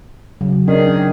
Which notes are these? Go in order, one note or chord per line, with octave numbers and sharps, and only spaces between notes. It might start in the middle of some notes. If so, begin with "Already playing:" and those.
C#3 F#3
D#3 C#4 D4 G#4